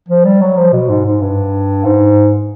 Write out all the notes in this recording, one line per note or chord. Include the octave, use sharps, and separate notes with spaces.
F3
G3
F#3
F3
B2
G#2
G#2
G2
G#2